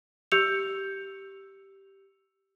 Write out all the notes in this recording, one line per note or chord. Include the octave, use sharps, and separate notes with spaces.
G4 E6 G6 C#7 F7